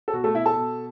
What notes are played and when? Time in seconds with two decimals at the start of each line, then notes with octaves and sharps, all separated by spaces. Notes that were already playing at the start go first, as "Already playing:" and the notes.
0.08 A4
0.13 B2 F#4
0.24 A3 A4
0.35 B2 E4 E5
0.46 A4 A5
0.57 B2